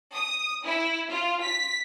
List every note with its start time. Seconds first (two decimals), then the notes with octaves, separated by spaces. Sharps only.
0.14 D#6
0.64 E4
1.10 F4
1.42 B6